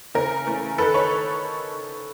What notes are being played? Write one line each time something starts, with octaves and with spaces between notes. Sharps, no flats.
C#3 A#4
E3 A3 C#4
D#3 A4 B4
B4 C#5